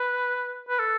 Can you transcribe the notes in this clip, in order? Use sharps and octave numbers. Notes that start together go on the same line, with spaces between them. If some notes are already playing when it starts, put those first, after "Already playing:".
Already playing: B4
B4
A4